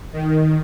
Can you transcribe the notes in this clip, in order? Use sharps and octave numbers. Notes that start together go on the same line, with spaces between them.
D#3